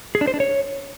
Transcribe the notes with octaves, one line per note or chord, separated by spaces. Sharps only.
G#4
D4
C5
D4
C#5